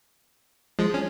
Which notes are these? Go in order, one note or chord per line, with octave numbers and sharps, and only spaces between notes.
F3 G#3
C#4